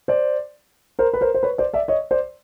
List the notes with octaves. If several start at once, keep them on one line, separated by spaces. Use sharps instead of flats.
C5 D5
A#4 C5
B4
A#4 C5
C5
B4 C#5
C5 D5
D5 E5
C#5 D#5
C5 D5